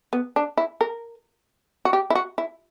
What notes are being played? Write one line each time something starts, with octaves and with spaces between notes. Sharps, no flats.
B3
D4
E4
A#4
F#4
G4
E4
F#4
E4